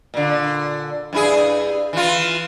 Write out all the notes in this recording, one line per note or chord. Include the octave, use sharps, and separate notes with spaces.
A#2 D3
G2 E4 G#4
E3 F4